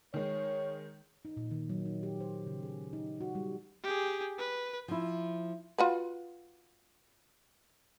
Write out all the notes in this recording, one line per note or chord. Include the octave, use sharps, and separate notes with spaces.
D#3 G#3 C#5
D#4
A#2
D#3
F#3
D#4
G4
C5
C#3
G#4
D#4
F#4
G3
G4 G#4
B4
F3 E4
F4 F#4 B4